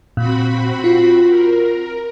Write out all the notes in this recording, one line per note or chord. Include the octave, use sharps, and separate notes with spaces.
A#2 C4 F#4 B5
F4
A#4